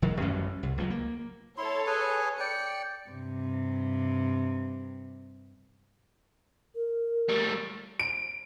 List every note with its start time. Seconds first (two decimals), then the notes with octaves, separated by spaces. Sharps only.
0.02 E1 D#3 F#3
0.20 A1 F#2 G3 C#4
0.63 C2
0.78 C#2 F3 F#3
0.90 A#3
1.58 E4 A4 C#5 C6
1.87 G#4 B4 G#5
2.40 D5 G5 C#7
3.10 G2 C3
6.75 A#4
7.29 G3 A3
7.99 D7